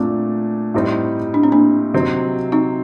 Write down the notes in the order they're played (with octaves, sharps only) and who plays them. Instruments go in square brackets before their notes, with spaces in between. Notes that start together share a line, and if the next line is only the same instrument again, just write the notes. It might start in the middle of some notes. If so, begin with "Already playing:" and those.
Already playing: [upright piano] A#2 A3 D4 [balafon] C4
[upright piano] A2 G3 C4 D#4
[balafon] D4
C4
A#3 D4
[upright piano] C3 F#3 C4 D#4
[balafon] C4 D#4